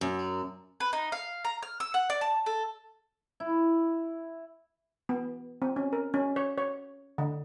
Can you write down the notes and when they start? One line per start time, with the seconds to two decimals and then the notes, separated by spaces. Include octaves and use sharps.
0.01 F#2
0.80 B4
0.93 D#4
1.12 F5
1.45 A#5
1.63 F6
1.80 E6
1.94 F#5
2.10 D5
2.21 A5
2.46 A4
3.40 E4
5.09 B3
5.62 C4
5.76 C#4
5.93 A#4
6.14 C#4
6.36 C#5
6.58 C#5
7.18 D3